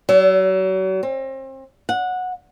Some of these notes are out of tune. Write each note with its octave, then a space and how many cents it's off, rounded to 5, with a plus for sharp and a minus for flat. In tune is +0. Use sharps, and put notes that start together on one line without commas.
F#3 +40
C4 +35
F#5 -15